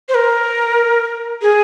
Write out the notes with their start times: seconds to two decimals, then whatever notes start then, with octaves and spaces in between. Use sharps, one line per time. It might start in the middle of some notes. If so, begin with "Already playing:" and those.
0.09 C5
0.15 A#4
1.42 G#4